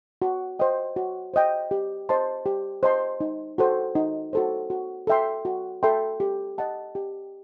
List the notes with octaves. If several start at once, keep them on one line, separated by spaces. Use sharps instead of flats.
F#4
C5 D#5 G5
F#4
C5 D#5 G5
G4
C5 D#5 A5 C6
G4
C5 D#5 A5 C6
D#4
F#4 A4 C5
D#4
F#4 A4 C5
F#4
A4 E5 G5 C6
F#4
A4 E5 G5 C6
G4
D#5 F#5 A5
G4